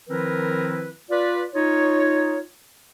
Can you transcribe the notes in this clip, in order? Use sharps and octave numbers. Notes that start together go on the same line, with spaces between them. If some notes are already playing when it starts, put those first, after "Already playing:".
D#3 F3 C4 E4 A#4 B4
F4 B4 D5
D#4 F4 C#5